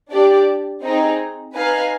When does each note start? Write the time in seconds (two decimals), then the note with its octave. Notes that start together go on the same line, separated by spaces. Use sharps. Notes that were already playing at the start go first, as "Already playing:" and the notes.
0.10 D4 G4 D5
0.82 C4 D#4 G#4
1.54 D#4 B4 F5 G#5